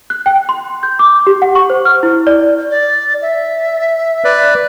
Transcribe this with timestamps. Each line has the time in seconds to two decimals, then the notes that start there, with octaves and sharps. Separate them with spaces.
0.10 F#6
0.26 G5
0.49 C6
0.83 G6
0.99 D6
1.27 G4
1.42 F#5
1.55 C#6
1.70 C5
1.85 F6
2.03 E4
2.27 D5
2.71 D5
3.22 E5
4.24 B4 D5